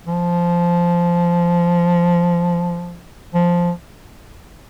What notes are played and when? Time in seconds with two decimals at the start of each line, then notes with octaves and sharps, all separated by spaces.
0.07 F3
3.34 F3